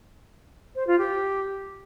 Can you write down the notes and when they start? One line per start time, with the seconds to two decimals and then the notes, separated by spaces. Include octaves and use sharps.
0.76 C5
0.87 F4
0.99 G4